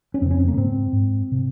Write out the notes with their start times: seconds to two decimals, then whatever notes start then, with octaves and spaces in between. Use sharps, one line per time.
0.14 C#4
0.21 F2 C4
0.26 C#3
0.31 C#4
0.40 C4
0.48 A#3
0.57 G#2 C4
0.93 G#2
1.31 C3